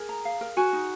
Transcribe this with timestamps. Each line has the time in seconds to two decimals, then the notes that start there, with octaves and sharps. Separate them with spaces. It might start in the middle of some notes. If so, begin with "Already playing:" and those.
Already playing: G#4 A#4
0.09 A#5
0.25 F5
0.41 A#4
0.57 F#4 G#5
0.73 D#4